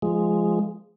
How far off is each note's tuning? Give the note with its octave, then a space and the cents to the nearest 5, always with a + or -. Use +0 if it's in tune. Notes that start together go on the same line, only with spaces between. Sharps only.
F3 -10 G#3 +0